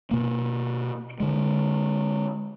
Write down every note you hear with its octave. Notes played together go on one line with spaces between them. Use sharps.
B2 A#3
D3 G#3